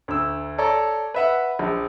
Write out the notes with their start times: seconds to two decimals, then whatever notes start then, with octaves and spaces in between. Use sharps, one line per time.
0.08 D2 E6
0.58 A4 C#5 D5 A#5
1.14 B4 E5 F#5
1.59 A#1